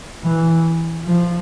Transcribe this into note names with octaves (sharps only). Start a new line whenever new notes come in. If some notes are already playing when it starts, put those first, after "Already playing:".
E3
F3